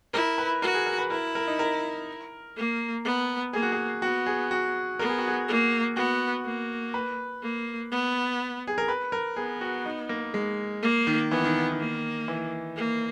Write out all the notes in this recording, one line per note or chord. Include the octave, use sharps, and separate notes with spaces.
E4 A#4
B4
F#4 A#4
G#4
A#4
B4
E4 A#4
A#4
D#4
A#4
A#3
B3
A#3 G#4
F#4
G#4
B3 F#4
G#4
F#4
B3 A#4
G#4
F#4
G#4
A#3
B3 F#4
A#3
B4
A#3
B3
G#4
A#4
B4
A#4
B3 G#4
F#4
D#4
A#3
G#3
A#3
D#3
E3 B3
D#3
D#3
A#3
E3
A#3